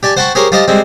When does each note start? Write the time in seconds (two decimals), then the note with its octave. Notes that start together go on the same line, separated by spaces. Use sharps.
0.03 G4 D5 G#5 A5
0.17 C5 F#5 G5 A5 B5 C#6
0.35 G4 G#4 A#4 C5 C#5
0.52 F4 G4 C5 D#5 A5
0.68 G3 G#3 C4